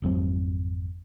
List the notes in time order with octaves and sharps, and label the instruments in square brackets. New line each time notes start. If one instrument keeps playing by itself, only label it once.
[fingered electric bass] G#1 F2 F#3 C4